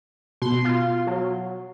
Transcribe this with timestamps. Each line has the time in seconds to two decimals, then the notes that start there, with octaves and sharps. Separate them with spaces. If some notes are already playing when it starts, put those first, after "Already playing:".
0.42 B2 C6
0.65 F4
1.07 F#3